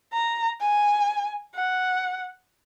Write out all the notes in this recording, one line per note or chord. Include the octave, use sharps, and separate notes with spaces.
A#5
G#5
F#5